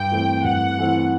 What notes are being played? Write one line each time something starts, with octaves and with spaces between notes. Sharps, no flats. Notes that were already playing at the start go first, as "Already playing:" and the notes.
Already playing: G2 G5
E3 A3 C4
G2 F#5
E3 A3 C4